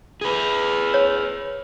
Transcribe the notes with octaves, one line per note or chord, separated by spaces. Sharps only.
G#4 B4
C#5